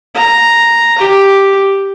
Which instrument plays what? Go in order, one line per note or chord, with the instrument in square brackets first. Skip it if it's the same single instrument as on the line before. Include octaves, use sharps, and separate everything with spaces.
[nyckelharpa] A#5
G4